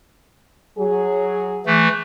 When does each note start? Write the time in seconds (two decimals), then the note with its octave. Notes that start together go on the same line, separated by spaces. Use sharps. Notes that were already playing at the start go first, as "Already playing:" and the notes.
0.79 F#3 G#4
1.66 E3 A3